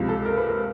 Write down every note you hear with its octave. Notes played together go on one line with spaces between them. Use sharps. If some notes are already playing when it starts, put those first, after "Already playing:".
Already playing: C#2 C3 F3
A4
A#4
B4
A#4